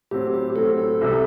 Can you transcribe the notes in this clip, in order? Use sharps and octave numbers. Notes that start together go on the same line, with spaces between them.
A2 F#3 C4 G4
G4
A2 F#3 C4 A4
A4
C2 C3 G3